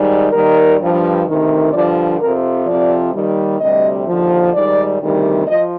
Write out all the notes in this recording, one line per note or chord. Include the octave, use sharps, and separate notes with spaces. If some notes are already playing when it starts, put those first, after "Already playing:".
Already playing: G#2 D#3 G3
D#2 D#3 G3 A#4
G2 F3
D2 C3 D#3
G2 D3 F3 D5
F2 C3 F3 A#4
F2 C3 F3 D5
D#2 D#3 G3
D2 C3 G3 D#5
D#2 D3 F3
G#2 D#3 G3 D5
D2 C3 D#3 G3
F3 D#5